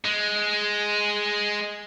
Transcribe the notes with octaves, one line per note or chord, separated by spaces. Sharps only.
G#3